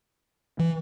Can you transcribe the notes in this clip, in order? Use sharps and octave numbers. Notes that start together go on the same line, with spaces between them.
E3